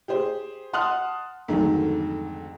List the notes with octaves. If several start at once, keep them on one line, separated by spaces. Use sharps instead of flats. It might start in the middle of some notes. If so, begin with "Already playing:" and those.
G4 G#4 C5
F#5 A5 C6 D#6 F6 F#6
F2 G#2 D3 D#3 F#3 A3